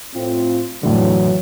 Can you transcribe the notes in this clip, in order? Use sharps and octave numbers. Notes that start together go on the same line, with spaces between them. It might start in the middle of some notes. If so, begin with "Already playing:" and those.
A2 C4 F4
F2 A2 D3 E3 F#3